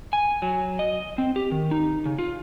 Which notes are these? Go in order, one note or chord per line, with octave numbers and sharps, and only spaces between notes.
G#5
F#3
D#5
C4
G4
D#3
D#4
C#3
F4